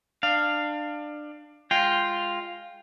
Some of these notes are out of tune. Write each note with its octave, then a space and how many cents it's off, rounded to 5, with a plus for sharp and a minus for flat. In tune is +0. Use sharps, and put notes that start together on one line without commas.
D4 +25 F5 +0
G#3 -5 F4 +0 G5 +0